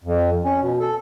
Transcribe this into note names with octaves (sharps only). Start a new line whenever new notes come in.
F2
C#4
B2
A4